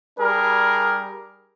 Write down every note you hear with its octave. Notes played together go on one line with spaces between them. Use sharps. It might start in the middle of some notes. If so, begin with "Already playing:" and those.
G3 D4 G#4 A#4